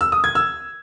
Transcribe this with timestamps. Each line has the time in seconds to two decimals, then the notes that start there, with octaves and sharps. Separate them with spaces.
0.01 E6
0.12 D#6
0.24 G#6
0.35 E6